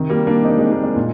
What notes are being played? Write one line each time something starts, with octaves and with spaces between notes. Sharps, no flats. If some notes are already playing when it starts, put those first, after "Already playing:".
Already playing: C3 D#3
G3 A#3
A#3 D4
C3 D#3 C4 D#4
G#3
A#3 D4
G#3
A#2